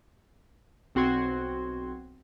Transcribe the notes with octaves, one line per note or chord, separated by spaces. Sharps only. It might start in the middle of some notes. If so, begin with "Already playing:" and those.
B1 C4 F#4 C6 G#6